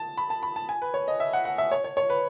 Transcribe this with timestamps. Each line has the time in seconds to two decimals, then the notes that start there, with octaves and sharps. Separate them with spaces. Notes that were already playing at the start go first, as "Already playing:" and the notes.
Already playing: A5
0.17 B5
0.30 A5
0.43 B5
0.56 A5
0.69 G#5
0.82 B4
0.94 C#5
1.08 D#5
1.20 E5
1.33 F#5
1.45 F#5
1.58 E5
1.71 C#5
1.84 C#5
1.97 C#5
2.10 B4